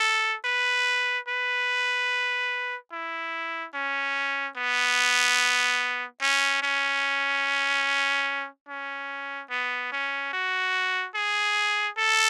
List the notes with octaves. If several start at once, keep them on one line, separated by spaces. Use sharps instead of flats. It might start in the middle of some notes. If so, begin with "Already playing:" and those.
Already playing: A4
B4
B4
E4
C#4
B3
C#4
C#4
C#4
B3
C#4
F#4
G#4
A4